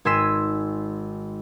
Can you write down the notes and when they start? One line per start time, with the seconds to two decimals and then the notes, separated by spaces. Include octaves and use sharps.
0.05 G#1 G#5 C6 E6 B6 D#7